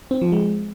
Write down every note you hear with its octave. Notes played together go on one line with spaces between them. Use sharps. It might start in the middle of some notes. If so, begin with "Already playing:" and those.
C4
F3
G#3